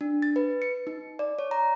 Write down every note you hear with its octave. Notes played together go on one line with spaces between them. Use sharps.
D4
A6
B4
C#7
D#4
D5
C#5
A#5